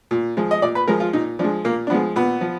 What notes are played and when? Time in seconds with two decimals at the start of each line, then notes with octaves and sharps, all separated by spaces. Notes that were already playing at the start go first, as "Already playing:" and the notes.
0.11 A#2
0.37 F3 G#3
0.51 D#5
0.62 A#2 D5
0.75 B4
0.88 F3 G#3 A#4
1.00 F4
1.13 A#2 D#4
1.39 F3 D4
1.44 G#3
1.64 A#2 A#3
1.87 D4
1.90 F3 G#3 B3
2.16 A#2 B3
2.41 F3